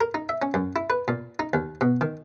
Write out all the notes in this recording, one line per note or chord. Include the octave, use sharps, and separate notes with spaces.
A#4
D#4
E5
C#4
F#2
E4
B4
A#2
D#4
D#2
B2
D#3